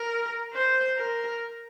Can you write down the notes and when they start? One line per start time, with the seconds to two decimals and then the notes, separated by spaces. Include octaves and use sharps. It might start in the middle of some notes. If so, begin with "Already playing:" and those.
Already playing: A#4
0.54 C5
0.97 A#4